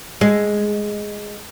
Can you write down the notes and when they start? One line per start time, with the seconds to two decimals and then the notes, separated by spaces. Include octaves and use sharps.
0.21 G#3